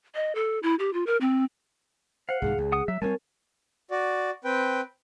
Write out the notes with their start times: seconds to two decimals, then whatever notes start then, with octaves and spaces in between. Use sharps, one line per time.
0.15 D#5
0.35 A4
0.63 E4
0.79 G4
0.93 F4
1.07 A#4
1.21 C4
2.29 C5 F5 F#5
2.42 C2 G#2 D#3 G#4
2.58 C#2
2.72 F#5 D#6
2.88 F#3 E5
3.02 G3 A3 C4 A#4 C#5 G#5 A5
3.91 F#4 D5
4.45 C4 B4 G5